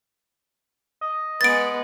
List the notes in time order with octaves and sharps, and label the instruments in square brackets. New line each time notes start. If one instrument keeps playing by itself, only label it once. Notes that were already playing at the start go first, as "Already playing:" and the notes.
[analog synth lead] D#5
[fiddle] G#3 B3 [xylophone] A6 D7